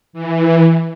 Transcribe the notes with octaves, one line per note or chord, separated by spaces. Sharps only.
E3